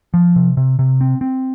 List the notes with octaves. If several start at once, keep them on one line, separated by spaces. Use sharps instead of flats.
F3
C3
C3
C3
C4
C4